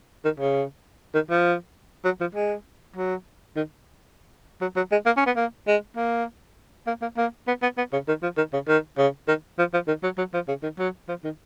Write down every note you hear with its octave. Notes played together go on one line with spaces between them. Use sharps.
D#3
C#3
D#3
F3
F#3
F3
G#3
F#3
D#3
F#3
F#3
G#3
A#3
C#4
B3
A#3
G#3
A#3
A#3
A#3
A#3
B3
B3
B3
C#3
D#3
F3
D#3
C#3
D#3
C#3
D#3
F3
F3
D#3
F#3
F#3
F3
C#3
D#3
F#3
F3
D#3